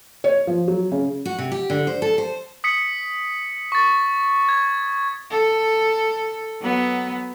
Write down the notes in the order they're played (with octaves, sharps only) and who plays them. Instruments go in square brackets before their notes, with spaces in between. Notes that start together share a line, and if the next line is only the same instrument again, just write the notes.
[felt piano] C#5
F3
F#3
C#3
[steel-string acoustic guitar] F#4
C3
G4
D3
C5
A4
C5
[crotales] D#6 B6 C#7
C#6 A6
G#6
[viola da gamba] A4
F#3 B3